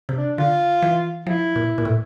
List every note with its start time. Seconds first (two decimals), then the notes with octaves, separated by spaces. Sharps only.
0.09 C3
0.16 D4
0.38 D3 F4
0.82 E3
1.26 F3 E4
1.56 A#2
1.78 A#2
1.85 A2